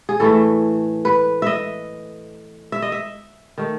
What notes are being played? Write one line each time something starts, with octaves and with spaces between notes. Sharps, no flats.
G#4
A2 E3 A3 A4
B4
D#5 E5
E5
D#5
E5
D#3 A3